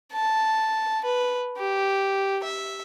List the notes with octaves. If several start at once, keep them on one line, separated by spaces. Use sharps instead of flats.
A5
B4
G4
E5